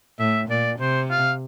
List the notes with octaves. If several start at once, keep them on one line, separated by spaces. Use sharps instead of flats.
A2 E5
A#2 D5
C3 C5
F5